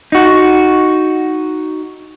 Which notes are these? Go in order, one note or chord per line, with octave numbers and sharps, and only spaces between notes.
D#4 F#4